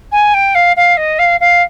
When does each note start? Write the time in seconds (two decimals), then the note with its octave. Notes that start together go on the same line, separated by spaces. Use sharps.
0.11 G#5
0.34 G5
0.54 F5
0.76 F5
0.97 D#5
1.18 F5
1.40 F5